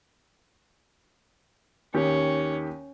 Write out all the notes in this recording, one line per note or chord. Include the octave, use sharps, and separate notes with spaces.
D#2 D#3 C#4 G4